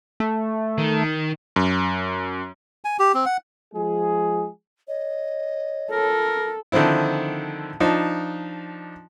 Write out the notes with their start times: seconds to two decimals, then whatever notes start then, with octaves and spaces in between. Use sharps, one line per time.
0.20 A3
0.78 D#3
1.56 F#2
2.85 G#5
2.99 G4
3.14 C4
3.26 F#5
3.74 F3 G#3 G#4
4.88 C#5 D#5
5.92 F4 A4 A#4
6.72 D3 D#3 F3 C4 E4
7.80 F3 D4 D#4